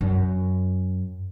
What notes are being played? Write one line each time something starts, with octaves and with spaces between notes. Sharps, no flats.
F#2